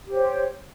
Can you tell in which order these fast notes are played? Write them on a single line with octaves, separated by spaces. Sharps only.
G4 C5 C#5